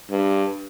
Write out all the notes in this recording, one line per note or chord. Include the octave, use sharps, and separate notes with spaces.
G2